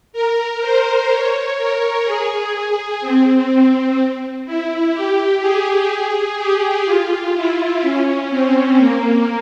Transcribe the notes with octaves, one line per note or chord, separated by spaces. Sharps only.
A#4
C5
C#5
A#4
G#4
G#4
C4
E4
G4
G#4
G4
F4
E4
C#4
C4
A#3